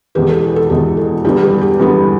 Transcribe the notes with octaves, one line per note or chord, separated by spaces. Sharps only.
E1 E2 B2 G4 B4
A4
A4
A4
E1 E2 B2 G4
A4
E2 D3 G3 B3 G4
G4 B4
G4
E2 D3 G3 B3